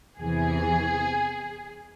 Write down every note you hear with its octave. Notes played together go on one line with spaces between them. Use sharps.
E2 C3 E3 G#4